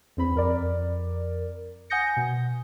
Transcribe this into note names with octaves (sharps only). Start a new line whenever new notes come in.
E2 C4 B5
F2 A#4 D5
F#5 G#5 D#6 G6 A#6 C#7
B2